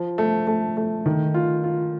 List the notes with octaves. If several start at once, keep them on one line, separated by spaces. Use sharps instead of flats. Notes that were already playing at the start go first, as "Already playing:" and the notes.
Already playing: F3
A3
A3
A3
D#3
F4
F4